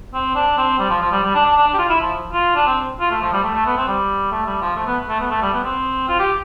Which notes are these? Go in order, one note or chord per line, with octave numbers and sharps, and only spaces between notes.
C4
D4
C4
G3
F3
F3
G3
G3
D4
D4
D4
D4
G4
F4
E4
F3
F4
D4
C4
F4
A3
F3
G3
A3
A3
B3
C4
G3
A3
G3
F3
A3
B3
A3
B3
A3
G3
B3
C4
F4
G4